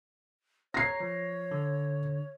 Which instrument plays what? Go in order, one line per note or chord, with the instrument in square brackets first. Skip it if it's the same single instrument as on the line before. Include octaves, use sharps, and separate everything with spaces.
[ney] C#5 [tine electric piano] A#5 G#6 [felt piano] A#6 C7
[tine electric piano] F3
D3